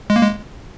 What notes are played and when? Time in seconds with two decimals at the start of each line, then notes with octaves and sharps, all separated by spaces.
0.10 G#3
0.16 A#3
0.22 G#3